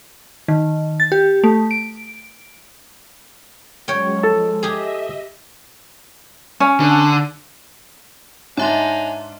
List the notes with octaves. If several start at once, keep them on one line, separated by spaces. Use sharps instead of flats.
D#3
A6
G4
A3
D7
F#3 G#3 C#4 C#5 G5
F3 G#3 A4 A5
G4 G#4 D#5 E5
C#4
D3
G#2 D4 D#4 C#5 E5 G#5 C6